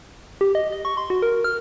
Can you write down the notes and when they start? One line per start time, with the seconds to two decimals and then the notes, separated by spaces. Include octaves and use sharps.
0.41 G4
0.55 D#5
0.72 D#5
0.85 C#6
0.97 C6
1.10 F#4
1.22 A#4
1.44 F6